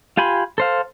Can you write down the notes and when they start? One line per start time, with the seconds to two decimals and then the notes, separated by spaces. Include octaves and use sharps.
0.17 F4 G4 G#5 B5 C6
0.58 A4 C5 F5